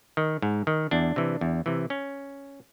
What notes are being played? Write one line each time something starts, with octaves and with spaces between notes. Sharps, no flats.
D#3
G#2
D#3
E2 D4
C3 E3
E2
C3 E3
C#4